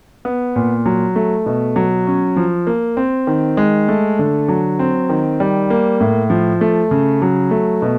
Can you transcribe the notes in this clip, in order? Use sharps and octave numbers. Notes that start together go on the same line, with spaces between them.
B3
A#2
F#3
A3
B2
F#3
C#4
F3
A#3
C4
D#3
G#3
A3
D3
F#3
C4
D#3
G3
A#3
A2
F3
A3
C#3
F#3
A3
B2